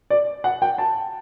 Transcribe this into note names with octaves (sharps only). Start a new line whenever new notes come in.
D5
F#5
G5
A5